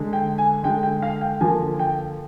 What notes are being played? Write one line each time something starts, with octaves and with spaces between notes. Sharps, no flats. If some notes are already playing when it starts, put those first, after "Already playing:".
Already playing: D3 G#3
G5
G#5
D3 G#3 G5
G5
F5
G5
D3 F3 A#3 G#5
G5